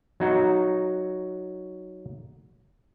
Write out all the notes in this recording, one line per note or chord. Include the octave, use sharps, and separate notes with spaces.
F#3 D#4 F#4